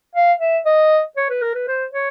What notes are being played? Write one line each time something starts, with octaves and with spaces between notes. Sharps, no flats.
F5
E5
D#5
C#5
B4
A#4
B4
C5
C#5